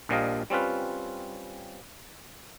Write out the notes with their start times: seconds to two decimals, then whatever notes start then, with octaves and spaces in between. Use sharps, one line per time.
0.09 A#1 A#2 F3 G3 D#5 F5
0.50 G3 C4 C#4 F4 B4